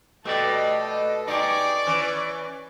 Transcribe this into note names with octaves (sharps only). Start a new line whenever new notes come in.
B2 A3 G4 A4 D5 D#5
D#4 G4 G#4 D5 C#6 D6
E3 C#4